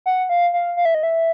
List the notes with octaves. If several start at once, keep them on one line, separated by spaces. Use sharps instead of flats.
F#5
F5
F5
F5
E5
D#5
E5